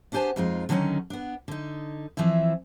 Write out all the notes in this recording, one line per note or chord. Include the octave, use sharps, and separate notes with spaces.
B3 D4 G4 C5 G#5 A5
F2 G#3 D#4 F4
D3 D#3 F#3 C4 C#4 D#4
B3 D4
D3 D#4
E3 F3 C4 E4